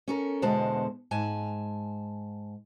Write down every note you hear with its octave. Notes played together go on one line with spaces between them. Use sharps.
C#4 A4 A#4
E2 B2 D3 G#3 C5 A5
G#2 G#5 A5